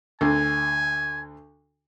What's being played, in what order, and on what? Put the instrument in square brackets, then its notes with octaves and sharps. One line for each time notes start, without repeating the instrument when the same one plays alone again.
[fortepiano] D2 D3 [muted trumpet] G#5